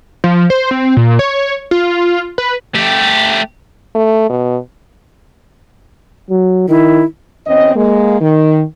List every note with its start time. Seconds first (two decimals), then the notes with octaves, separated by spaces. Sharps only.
0.24 F3
0.50 C5
0.71 C4
0.97 A#2
1.19 C#5
1.71 F4
2.38 B4
2.75 A3 G4
3.95 A3
4.29 B2
6.30 F#3
6.68 D#3 E4
7.47 E2 C4 C#4 D#5
7.75 G#3 A#3
8.21 D#3